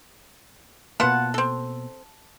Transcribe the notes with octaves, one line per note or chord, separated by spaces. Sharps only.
B2 A#3 B3 F4 F#5 A5 F#6
C4 A4